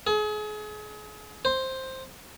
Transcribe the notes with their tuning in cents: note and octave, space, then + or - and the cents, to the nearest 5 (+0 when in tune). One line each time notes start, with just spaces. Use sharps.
G#4 +35
C5 +5